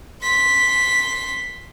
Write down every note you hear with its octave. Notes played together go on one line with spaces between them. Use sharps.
C6 B6